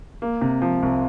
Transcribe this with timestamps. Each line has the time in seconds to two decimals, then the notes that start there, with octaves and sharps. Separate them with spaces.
0.22 A#3
0.41 C3
0.62 F3
0.83 C2